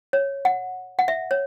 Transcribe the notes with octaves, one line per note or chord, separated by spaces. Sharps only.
C#5
F#5
F#5
E5
C#5